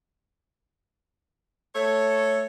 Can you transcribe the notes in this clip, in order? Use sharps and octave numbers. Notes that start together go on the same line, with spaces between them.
A3 A4 C#5